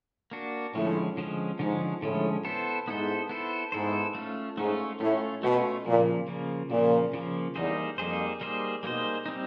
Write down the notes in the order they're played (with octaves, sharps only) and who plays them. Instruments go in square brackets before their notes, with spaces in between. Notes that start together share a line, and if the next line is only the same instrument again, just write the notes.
[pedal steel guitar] A#3 D4 F#4
[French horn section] A2 [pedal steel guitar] D3 F3 G#3 C#4
[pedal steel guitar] D3 F3 G#3 C#4
[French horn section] G#2 [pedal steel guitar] D3 F3 G#3 C#4
[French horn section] A2 [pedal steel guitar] D3 F3 G#3 C#4
[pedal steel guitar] B3 E4 A4 C5
[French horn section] G#2 [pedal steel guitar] B3 E4 A4 C5
[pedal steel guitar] B3 E4 A4 C5
[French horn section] G#2 [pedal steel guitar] B3 E4 A4 C5
[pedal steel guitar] A3 C#4 F4
[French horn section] G#2 [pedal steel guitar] A3 C#4 F4
[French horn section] A2 [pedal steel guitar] A3 C#4 F4
[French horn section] B2 [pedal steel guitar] A3 C#4 F4
[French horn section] A#2 [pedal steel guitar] C#3 F3 A#3
[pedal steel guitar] C#3 F3 A#3
[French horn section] A#2 [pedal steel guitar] C#3 F3 A#3
[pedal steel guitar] C#3 F3 A#3
[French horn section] E2 [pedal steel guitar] G3 A#3 D#4 G#4 C5
[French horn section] F2 [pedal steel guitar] G3 A#3 D#4 G#4 C5
[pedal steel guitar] G3 A#3 D#4 G#4 C5
[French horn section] B2 [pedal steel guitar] G3 A#3 D#4 G#4 C5
[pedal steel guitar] G3 C4 D#4